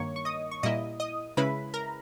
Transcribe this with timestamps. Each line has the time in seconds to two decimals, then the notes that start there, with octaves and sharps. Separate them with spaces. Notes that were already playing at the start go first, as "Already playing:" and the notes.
Already playing: G2 D#3 A#3 C#5 C#6
0.16 C#6
0.25 D#5 D#6
0.51 C#6
0.63 A#2 G3 A#3 E4 D#5 D#6
1.00 D#5 D#6
1.37 C#3 G#3 C#4 E4 B4 B5
1.74 A#4 A#5